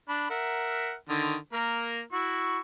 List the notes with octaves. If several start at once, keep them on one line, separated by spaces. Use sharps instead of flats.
D4 B5
A#4 E5 F#5
D3 D#3
A#3 A#4
E4 F#4 C#6